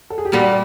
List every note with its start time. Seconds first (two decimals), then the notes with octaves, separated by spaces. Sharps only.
0.10 A4
0.18 G#4
0.25 G4
0.32 A#2 G3 A#3 F#4